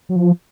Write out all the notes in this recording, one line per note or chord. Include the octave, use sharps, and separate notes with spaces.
F#3
F3